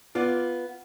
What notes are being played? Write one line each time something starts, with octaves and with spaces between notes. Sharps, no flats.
B3 F4 D5